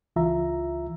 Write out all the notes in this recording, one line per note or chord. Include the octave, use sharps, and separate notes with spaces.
C#2 E3 F4 E5 A#5